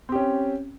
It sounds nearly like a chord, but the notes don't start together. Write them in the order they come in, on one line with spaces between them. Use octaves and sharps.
C4 G4 C#4